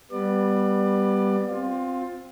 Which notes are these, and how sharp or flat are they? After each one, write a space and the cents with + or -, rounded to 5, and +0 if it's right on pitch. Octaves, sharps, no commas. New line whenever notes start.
G3 +0 B3 +0 D5 +25
C4 +0 F4 +20